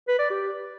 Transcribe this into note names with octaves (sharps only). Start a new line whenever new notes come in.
B4
D5
G4